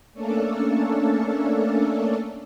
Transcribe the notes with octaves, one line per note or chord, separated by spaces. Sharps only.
A3 A#3 C#4 D4 A4